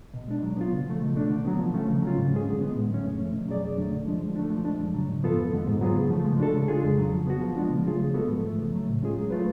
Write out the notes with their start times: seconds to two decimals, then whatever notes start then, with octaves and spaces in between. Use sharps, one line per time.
0.14 B2
0.28 G#3 D4
0.43 F#3
0.57 B3 F4
0.72 C#3
0.87 F3 A3
1.01 B2
1.16 A3 D4
1.30 D3
1.45 F#3 B3
1.59 F3
1.74 A3 C#4
1.88 C#3
2.03 F#3 C#4 F4
2.17 G#2
2.32 G#3 C#4 G#4
2.47 D3
2.61 G#3 B3
2.75 A2
2.90 F#3 A3 C#4
3.05 F#2
3.19 F3 A3
3.34 B2
3.48 F#3 C#4 G#4 D5
3.63 F2
3.77 D3 F#3 A3 D4
3.92 D3
4.06 F3 G#3 D4
4.21 F3
4.36 A3 D4
4.50 F3
4.65 G#3 D4
4.79 F#2
4.94 C#3 F#3
5.08 G#2
5.23 F3 B3 F4 A4
5.38 F2
5.52 D3 G#3 B3
5.67 G#2
5.81 F#3 B3 F4 G#4
5.96 C#3
6.10 F3 A3
6.25 G#3
6.40 D4 F#4 A4
6.54 C#3
6.68 G#3 D4 F4 G#4
6.83 F2
6.98 C#3 F#3
7.12 F3
7.27 B3 F#4
7.41 F3
7.56 G#3 B3 D4 F4
7.70 C#3
7.85 F#3 A3 F4 G#4
8.00 F3
8.14 G#3 B3 F#4 A4
8.29 G#2
8.43 F3 A3
8.58 C#3
8.72 F#3 A3
8.87 A2
9.02 G#3 C#4 F4 G#4
9.16 F#3
9.30 A3 F4 B4